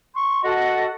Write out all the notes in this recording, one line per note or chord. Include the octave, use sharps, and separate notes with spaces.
C6 C#6
F#4 A4 D#5 F#5